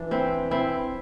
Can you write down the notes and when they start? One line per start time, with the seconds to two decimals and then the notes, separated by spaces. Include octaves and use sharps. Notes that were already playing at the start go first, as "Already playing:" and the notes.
Already playing: E3 D4
0.11 C4 E4
0.51 C4 E4